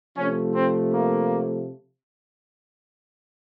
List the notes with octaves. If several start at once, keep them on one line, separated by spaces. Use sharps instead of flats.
C3 F3 A3 C#4
C4
A#3